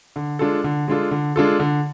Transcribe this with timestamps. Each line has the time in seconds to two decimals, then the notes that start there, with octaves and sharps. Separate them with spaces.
0.16 D3
0.39 G#3 D4 F4 A4
0.64 D3
0.88 G#3 D4 F4 A4
1.11 D3
1.36 G#3 D4 F4 A4
1.59 D3